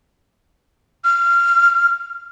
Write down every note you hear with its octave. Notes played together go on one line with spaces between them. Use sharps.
F6